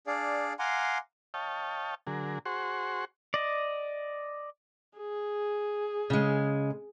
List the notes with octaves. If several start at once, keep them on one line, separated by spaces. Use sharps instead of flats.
D4 G#4 D5 F5
F5 F#5 G#5 A#5 C6 D6
C#5 D#5 F5 G5 A5
D3 F#3 G#4 A#4
F#4 G#4 C5 F#5 C6 C#6
D5 D#5
G#4
C#3 G#3